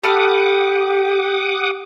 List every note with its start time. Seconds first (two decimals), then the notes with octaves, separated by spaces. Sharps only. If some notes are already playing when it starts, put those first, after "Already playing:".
0.04 G4 A4 F#5 B5 D6 D#6 F6